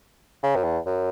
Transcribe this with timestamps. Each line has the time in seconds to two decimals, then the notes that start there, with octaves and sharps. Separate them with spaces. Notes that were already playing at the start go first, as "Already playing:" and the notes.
0.43 C#3
0.56 F#2
0.64 E2
0.86 F#2